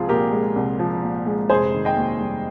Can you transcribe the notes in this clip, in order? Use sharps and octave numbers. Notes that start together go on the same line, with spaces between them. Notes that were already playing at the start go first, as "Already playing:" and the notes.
Already playing: C2 F3 G#3 C4 F4 G#4
A#2 G4 A#4
G#3
C2
F3
A#2
G#3
F1 G#4 C5
D#3
D#5 G5
D#2
G3